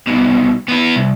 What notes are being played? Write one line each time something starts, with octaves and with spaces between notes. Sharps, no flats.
C2 B2
B3 E4
C2